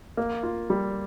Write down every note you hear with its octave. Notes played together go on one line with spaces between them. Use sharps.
A#3
F4
G3